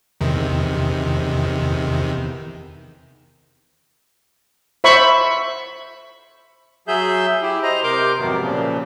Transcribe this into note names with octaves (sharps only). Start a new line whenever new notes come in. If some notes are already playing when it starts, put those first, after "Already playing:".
E2 C3 D#3
C5 E5 B5 C#6
F#3 G#4 E5 G6
E4 G4
C5 D#5 A#5
C3 A#4 C6 D6 G6
F2 G#2 C3 D#3 F#3 B3
A#2 C#3 F3